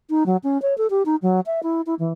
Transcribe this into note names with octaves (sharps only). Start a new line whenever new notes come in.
D#4
F#3
C#4
C#5
A4
G4
D#4
F#3
E5
E4
E4
E3